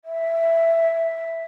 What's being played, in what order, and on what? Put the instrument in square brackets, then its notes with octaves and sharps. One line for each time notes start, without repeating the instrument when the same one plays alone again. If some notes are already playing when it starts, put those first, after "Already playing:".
[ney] E5